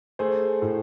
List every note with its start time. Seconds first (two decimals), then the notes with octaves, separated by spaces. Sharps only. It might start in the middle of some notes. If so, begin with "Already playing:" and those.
0.19 A3 G#4 C5
0.62 A2